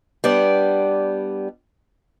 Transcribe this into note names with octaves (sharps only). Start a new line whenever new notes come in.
G3 B3 D4 D5